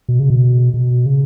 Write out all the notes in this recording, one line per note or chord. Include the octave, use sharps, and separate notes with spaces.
B2
C#3
B2
B2
C#3